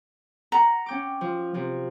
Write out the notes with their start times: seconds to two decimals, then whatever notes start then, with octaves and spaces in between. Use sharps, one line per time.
0.52 F#5 A#5
0.86 C#4 G5 D6
1.21 F3
1.54 C3 F3